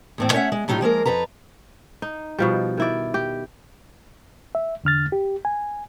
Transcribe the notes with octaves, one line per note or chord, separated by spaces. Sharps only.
E2 A2 C4
A3 C#4 C#5 D#5 E5 F#5
G#3
A2 F#3 D#4 F4 G4
F3 G#3 A#3 A#4
F2 A4 B4 A#5
D#4
B2 F3 G3
D#3 E4 D5
G4
E5
E2 D3 F6 A6
G4
G#5